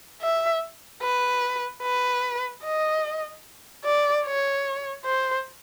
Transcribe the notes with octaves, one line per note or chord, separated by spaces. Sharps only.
E5
B4
B4
D#5
D5
C#5
C5